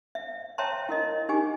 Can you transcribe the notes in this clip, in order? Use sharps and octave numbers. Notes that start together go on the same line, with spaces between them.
E5
C#5 E5 G5 A5 A#5 C6
E4 A#4 D#5
D#4 G4 G#5 D6